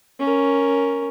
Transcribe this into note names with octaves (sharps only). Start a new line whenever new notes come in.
C#4 A#4